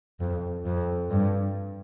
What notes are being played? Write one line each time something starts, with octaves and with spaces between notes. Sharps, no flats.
F2
F2
G2